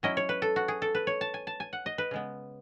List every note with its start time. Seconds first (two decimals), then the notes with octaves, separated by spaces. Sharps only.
0.03 F#3 C#4 E4 D#5
0.17 C#5
0.29 B4
0.42 A4
0.56 F#4
0.68 G#4
0.82 A4
0.95 B4
1.07 C#5
1.21 A5
1.34 G#5
1.47 A5
1.60 G#5
1.73 F#5
1.86 D#5
1.98 B4
2.11 C#3 G#3 B3